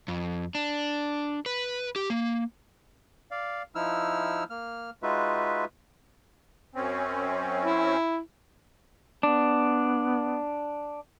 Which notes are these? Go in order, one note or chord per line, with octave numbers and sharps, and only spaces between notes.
F2
D4
B4
G4
A#3
D5 F5
F3 D#4 E4 E6 F6
A#3 F6
G#3 D#4 F4 F#4 B4 E5
F#2 C4 C#4
E4
B3 D4